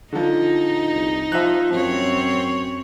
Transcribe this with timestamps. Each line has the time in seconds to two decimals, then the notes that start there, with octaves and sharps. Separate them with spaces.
0.12 D3 F3 D#4
0.94 C2
1.32 F3 E5 F#6
1.73 F#2 C4 C#5